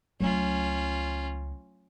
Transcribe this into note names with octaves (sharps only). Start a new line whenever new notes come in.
C#2 C#3 F#3 A3 C#4 F4